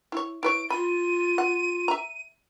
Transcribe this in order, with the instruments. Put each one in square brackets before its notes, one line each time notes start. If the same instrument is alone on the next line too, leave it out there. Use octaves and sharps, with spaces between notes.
[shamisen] E4 C#5
[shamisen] E4 B4 C#5 [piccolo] D7
[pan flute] F4 [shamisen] B5 [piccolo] D#7
[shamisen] F#5
E5 A#5